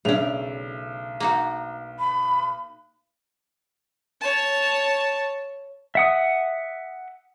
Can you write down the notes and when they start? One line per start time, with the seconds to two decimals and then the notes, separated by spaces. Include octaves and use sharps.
0.05 B1 C#3 A3 C#4 D4 F7
1.20 A#3 D#4 F#4
1.99 B5
4.21 C#5 A5
5.95 E5 F#5 D#6